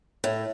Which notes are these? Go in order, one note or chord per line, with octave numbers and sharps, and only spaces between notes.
A2